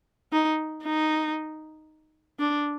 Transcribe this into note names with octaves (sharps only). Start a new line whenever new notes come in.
D#4
D#4
D4